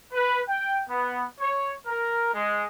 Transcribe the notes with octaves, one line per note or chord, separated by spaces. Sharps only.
B4
G5
B3
C#5
A#4
G#3